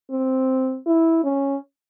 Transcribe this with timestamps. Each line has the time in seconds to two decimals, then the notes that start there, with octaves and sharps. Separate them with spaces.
0.11 C4
0.86 E4
1.24 C#4